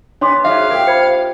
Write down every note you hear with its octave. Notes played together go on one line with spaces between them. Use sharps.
B3 D4 C#5 C6 D6
G#2 F#3 E5 F5
A#2 G4 A#4
C5 B5 G#6 C#7